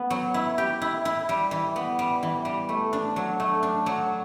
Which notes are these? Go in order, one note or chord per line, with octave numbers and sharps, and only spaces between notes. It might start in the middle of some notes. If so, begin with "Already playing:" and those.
Already playing: B3
F#3
E4
G4
E4
E4
G3
E3
B3
G3
E3
G3
A3
D4
F#3
A3
D4
F#3